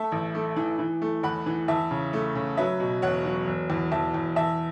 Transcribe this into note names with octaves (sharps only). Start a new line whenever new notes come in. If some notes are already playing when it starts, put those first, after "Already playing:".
Already playing: A3 E5 A5
A1
A3
E3
E3
A3
E2 F#5 B5
E3
E2 E5 A5
C#3
A3
C#3
F#3 B4 E5
B2
E1 C#5 F#5
F#3
E1
E2
E2 E5 A5
E2
E2 E5 A5